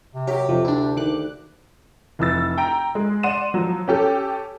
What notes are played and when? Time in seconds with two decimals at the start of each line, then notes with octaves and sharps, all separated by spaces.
0.15 C3
0.27 F#3 G4 A#4
0.49 F2 C3 F3
0.65 D2 D4 E4
0.97 D#3 D6 F#6
2.19 F1 E3 E6 A6
2.58 G5 A#5 D7
2.95 G#3
3.23 D5 F#5 C6 D#7 E7
3.54 F3 F#3
3.88 C#4 G4 A4